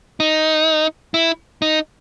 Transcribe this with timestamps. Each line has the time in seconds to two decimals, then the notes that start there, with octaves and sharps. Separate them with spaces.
0.20 D#4
1.14 E4
1.62 D#4